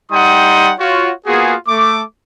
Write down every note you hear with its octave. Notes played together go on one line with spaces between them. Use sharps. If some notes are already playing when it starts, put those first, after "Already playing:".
G3 D#4 F#5 G5 C6 D#6
F4 F#4 C#5
A#3 B3 F4 F#4 G#4
A3 D6